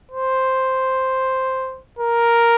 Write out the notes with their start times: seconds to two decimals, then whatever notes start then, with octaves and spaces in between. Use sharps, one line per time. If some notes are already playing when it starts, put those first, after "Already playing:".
0.12 C5
1.99 A#4